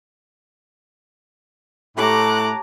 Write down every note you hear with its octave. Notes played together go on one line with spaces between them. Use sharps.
A2 A3 G4 C#5 A5 A#5 D6 F#6